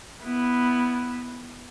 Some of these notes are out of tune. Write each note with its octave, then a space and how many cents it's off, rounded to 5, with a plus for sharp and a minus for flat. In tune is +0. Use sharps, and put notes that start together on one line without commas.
B3 +0 E4 +0